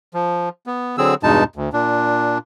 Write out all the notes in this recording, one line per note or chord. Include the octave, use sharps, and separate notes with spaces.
F3
B3
D3 F#3 C4 G#4 E6
E2 G2 B2 G#3 D#4 A5
D2
A#2 D4